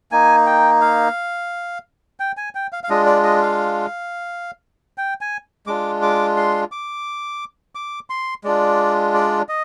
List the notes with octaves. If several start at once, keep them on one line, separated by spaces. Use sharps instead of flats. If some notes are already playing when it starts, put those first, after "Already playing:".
A#3 D#4 G#5
G5
F5
G5
G#5
G5
F5
F5
G#3 D4 F4 D#5
D5
D#5
F5
G5
G#5
G#3 D4 F4 D6
D6
C6
D6
D6
C6
G#3 D4 F4 D5
D5
D#5